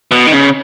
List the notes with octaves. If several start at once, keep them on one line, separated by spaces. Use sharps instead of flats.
B2
D#3
C#3